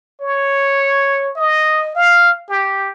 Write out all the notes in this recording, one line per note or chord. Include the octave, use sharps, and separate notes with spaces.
C#5
D#5
F5
G4